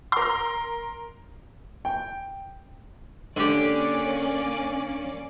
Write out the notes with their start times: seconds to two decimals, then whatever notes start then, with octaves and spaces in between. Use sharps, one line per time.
0.12 A#4 C6
1.85 G5
3.37 D3 A#3 C#4 G4 D5